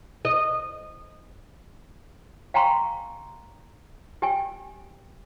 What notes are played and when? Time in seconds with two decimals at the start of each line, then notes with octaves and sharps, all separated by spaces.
0.25 D#5
2.54 F5 G5 G#5 A#5 C6 C#6
4.22 G4 G5 G#5